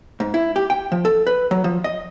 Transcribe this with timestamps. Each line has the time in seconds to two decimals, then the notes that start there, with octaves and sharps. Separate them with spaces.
0.20 G#2
0.34 E4
0.56 G4
0.70 G5
0.92 F3
1.05 A4
1.27 B4
1.51 F#3
1.64 F3
1.84 D#5